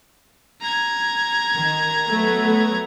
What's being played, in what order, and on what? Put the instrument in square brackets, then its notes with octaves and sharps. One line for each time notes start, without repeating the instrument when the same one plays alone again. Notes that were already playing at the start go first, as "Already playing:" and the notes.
[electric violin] A#5 G#6
[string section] D#3
F#3 A3 B3